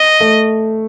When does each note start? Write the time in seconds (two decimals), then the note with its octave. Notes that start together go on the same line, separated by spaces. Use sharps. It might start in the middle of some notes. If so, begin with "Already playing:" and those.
Already playing: D#5
0.20 A3